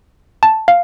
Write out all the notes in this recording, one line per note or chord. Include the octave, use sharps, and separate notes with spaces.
A5
F5